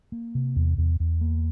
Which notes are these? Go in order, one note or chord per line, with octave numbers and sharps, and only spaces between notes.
A#3
C3
E2
E2
E2
A#3